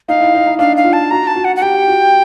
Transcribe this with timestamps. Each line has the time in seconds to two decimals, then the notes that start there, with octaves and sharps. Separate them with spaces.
0.09 D#4 F5
0.21 E4
0.35 D#4
0.46 D#4
0.59 D4 F5
0.77 F5
0.85 F4
0.93 A5
1.11 F#4 A#5
1.27 A5
1.36 F#4
1.45 F#5
1.56 F#5
1.61 G4 G5
1.88 F#4